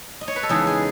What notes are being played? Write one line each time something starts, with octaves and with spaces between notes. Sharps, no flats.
D#5
C#5
B4
A4
E2 C#3 G#3 D#4 G#4
G#4